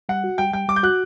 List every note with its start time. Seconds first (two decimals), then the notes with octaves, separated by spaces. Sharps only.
0.09 G3 F#5
0.24 F#4
0.38 G3 G5
0.53 G3 G5
0.68 G3 D6
0.76 G6
0.83 F#4 F#6